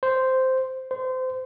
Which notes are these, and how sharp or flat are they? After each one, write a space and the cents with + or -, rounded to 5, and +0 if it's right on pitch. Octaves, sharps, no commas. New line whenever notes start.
C5 -5
C5 -25